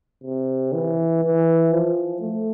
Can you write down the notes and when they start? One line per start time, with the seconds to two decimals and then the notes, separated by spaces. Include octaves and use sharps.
0.23 C3
0.73 E3
1.23 E3
1.72 F3
2.21 A3